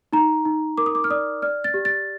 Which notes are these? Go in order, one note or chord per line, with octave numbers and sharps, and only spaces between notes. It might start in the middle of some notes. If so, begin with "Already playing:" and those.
D#4 A#5
D#4
A#4 D6
D#6
D6
F6
D5 D#6
D5 F6
A6
G4
A6